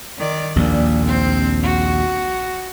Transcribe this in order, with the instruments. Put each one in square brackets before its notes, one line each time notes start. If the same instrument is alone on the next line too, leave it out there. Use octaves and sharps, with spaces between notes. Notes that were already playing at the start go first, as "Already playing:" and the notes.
[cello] D#3 D5
[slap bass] A#1 D#2 [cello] A#2
[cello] C4 C5
F#4